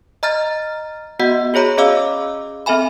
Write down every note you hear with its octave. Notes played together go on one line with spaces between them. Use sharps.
D#5 A#5 F6 A6
B3 F#4 D#5 F#5
F#4 G#4 C#5 A#5 B5
C#4 G#4 D#5 F5 D6 E6
C4 A4 E5 G#5 B5